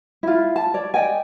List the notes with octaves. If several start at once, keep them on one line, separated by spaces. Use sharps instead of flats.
E4 F4
A5
C#5 D5
D5 D#5 G5 G#5